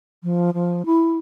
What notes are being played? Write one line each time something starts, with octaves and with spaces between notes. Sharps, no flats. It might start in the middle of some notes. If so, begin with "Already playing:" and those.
F3
F3
E4